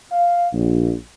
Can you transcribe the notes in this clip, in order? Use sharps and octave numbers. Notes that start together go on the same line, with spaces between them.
F5
A#1